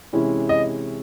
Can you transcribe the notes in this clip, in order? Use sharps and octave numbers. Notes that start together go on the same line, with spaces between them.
C3 E3 G#3 C#4 E4
D#5